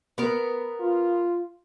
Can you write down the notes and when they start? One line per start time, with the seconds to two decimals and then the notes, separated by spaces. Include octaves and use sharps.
0.18 B3 A#4
0.80 F4